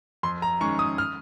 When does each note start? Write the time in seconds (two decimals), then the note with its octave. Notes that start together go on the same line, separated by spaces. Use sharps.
0.23 F2 C6
0.42 A#5
0.61 D#3 G#3 C#4 C#6
0.79 D#6
0.98 F6